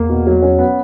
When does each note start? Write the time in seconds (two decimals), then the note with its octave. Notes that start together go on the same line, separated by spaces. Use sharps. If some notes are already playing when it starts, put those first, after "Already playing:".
Already playing: E2 A#3
0.09 B2
0.27 F#3
0.42 C#4
0.59 B3